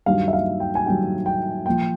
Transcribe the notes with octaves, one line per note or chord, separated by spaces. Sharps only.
G2 D#3 F#3 F5
E5
F5
G5
G#5
G2 D#3 F#3 G5
G5
A#2 F3 G5